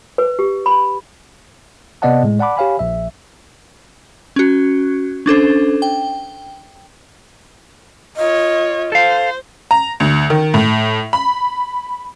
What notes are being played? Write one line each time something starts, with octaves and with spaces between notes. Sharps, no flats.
B4
G4
B5
C3 B3 D5 D#5 F#5 A5
A2 G#3
D5 F#5 A5 B5 D6
G4 C#5 F5 G#5 B5
A#1 E5
C#4 F#4
C#4 D4 A4 C5
G5
F4 C#5 D#5
A4 C5 F5
A#5
D2
D#3
A2
B5